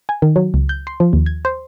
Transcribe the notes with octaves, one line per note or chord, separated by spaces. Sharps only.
G#5
D#3
F#3
C#2
G6
C6
F3
D#2
G#6
C5